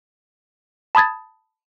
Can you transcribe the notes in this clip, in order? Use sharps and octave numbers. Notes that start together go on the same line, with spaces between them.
A5 B5 D#6 G#6 A6